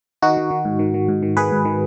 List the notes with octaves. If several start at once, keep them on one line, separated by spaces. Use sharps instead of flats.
D#3 D#4 F#4
D#3
D#3
G#2
D#3
D#3
G#2
D#3
D#3 G#4 B4
G#2
D#3